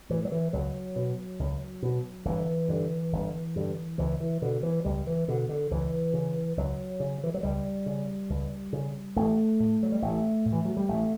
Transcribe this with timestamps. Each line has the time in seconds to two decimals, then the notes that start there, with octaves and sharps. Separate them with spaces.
0.10 A2 E3
0.25 F#3
0.32 E3
0.53 C#2 F#3
0.96 B2
1.39 C#2
1.82 B2
2.25 G1 E3
2.68 G2 D3
3.12 G1
3.56 G2 D3
3.98 C#2 E3
4.20 E3
4.42 B2 D3
4.63 E3
4.85 C#2 G3
5.07 E3
5.28 B2 D3
5.49 D3
5.71 C#2 E3
6.14 C#3
6.57 C#2 F#3
7.00 C#3
7.24 E3
7.34 F#3
7.43 C#2 G3
7.86 C#3
8.30 C#2
8.73 C#3
9.16 A1 A3
9.60 A2
9.83 F#3
9.92 G3
10.02 A1 A3
10.45 A2
10.53 E3
10.65 F#3
10.77 G3
10.88 A1 A3